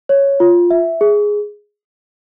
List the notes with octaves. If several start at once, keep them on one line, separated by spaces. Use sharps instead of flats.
C#5
F4
E5
G#4